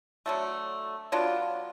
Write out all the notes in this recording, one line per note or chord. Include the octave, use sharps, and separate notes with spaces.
D3 F#3 A3
F#3 B3 D4 F4